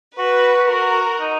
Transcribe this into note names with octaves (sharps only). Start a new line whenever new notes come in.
F#4 B4
F#4 A#4
D#4